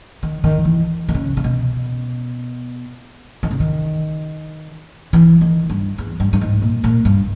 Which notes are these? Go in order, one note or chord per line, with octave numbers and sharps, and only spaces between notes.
D#3
D#3
E3
D#3
C#3
C#3
B2
D#3
C#3
D#3
E3
D#3
G2
E2
G2
G2
G#2
A#2
A#2
G2